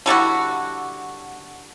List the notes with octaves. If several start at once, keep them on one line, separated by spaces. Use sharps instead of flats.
D3 G3 E4 F#4